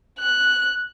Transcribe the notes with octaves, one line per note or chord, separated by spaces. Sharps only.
F#6